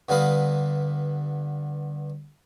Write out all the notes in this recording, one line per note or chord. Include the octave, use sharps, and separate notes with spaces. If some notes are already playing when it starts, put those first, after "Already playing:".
G2 D3 B3 F5 B5 D#6